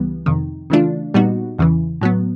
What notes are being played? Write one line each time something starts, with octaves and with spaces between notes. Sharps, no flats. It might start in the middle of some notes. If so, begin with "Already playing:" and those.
Already playing: C#2 E3 G3 B3
F2 C3 D#3
C#3 E3 A3 D4 F4
A#2 G3 B3 D#4 F#4
E2 C#3 E3
A2 F#3 B3